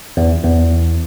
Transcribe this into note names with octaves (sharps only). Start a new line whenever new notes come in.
E2
E2